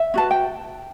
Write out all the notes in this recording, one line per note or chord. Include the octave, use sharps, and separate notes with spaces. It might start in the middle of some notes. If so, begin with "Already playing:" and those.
Already playing: E5
C#4 F#4 B4 A5
G5